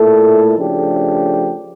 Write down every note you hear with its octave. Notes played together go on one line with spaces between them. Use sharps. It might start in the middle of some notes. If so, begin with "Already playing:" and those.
Already playing: A#2 A3 E4 A4
C#3 F3 A3 D4 G4